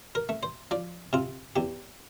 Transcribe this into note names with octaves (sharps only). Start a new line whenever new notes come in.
A#4
A3
C5
F3 D5
C3 F4
E2 G4